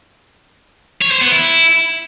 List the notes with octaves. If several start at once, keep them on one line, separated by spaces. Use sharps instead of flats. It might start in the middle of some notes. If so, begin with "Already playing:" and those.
C#5
C5
B3
E4